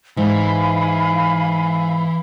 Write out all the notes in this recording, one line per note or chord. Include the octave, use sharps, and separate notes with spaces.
G#2 E3 F5 G#5 B5